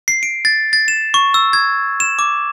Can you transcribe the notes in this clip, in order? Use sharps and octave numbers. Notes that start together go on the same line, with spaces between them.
C7
D7
A6
A6
E7
C#6
E6
G#6
E7
D6